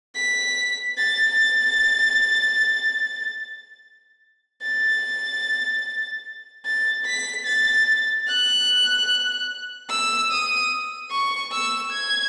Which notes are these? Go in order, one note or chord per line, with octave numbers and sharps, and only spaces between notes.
B6
A6
A6
A6
B6
A6
F#6
E6
D#6
C#6
E6
G#6